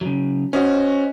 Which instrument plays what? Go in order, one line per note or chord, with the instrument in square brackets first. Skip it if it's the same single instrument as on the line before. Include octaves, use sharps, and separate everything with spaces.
[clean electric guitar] C#3 F#3
[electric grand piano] C#4 F#4 [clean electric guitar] C5 D#5